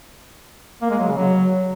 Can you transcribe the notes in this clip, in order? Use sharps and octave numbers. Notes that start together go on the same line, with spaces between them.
A#3
G#3
F#3
C#3
F#3